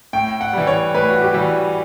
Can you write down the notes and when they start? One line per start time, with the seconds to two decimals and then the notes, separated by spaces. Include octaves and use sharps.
0.13 A2 G5
0.41 F#5
0.53 E3 G3
0.67 C#5
0.94 A2 B4
1.10 F#4
1.22 G4
1.34 E3 G3